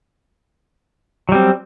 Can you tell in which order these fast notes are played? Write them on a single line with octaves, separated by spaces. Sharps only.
F#3 G3 C4